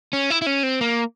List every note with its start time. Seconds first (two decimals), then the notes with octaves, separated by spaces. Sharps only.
0.13 C#4
0.30 E4
0.42 E4
0.46 C#4
0.63 C4
0.81 A#3